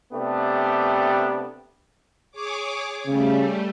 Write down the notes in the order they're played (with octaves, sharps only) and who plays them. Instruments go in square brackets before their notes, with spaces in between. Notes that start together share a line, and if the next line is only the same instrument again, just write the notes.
[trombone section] C3 A3 B3 D4 G4
[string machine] G#4 C#5 D6
[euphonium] C#3 [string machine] G3 A3